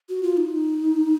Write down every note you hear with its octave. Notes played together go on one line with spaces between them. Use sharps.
F#4
F4
D#4